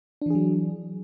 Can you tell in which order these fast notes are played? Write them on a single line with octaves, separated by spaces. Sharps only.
D4 E3 G#4 F#3